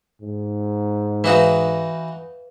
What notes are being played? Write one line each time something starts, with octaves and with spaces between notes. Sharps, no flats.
G#2
E3 D#4 F#4 B4 F5 D#6